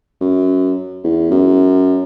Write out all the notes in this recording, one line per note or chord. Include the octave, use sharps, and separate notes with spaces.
F#2
E2
F#2